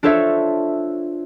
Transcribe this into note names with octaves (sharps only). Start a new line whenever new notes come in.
D4 F4 A4 C5 C#5 E5